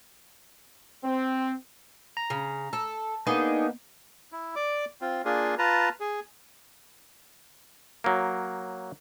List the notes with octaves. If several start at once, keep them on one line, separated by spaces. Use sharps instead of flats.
C4
A#5
C#3
A4
A#3 B3 D4 D#4 G#4
E4
D5 D6
C4 F4
A#3 D4 F4 G#4
F4 B4 A5 A#5
G#4
F#3 A#3